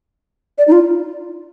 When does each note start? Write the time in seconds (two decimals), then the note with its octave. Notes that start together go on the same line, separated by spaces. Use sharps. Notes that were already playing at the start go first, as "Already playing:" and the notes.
0.58 D5
0.68 D#4
0.72 F4